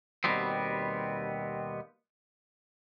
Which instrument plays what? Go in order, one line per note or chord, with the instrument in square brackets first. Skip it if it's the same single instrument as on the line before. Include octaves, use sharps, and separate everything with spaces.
[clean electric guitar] D#2 B2 G3 B3 C4